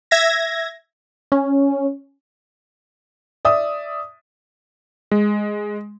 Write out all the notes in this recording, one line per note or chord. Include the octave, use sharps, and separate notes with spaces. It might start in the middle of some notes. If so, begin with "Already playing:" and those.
E5 G#6 A#6
C#4
D5 E5 D#6
G#3